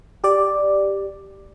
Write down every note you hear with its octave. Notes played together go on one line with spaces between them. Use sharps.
G4 D5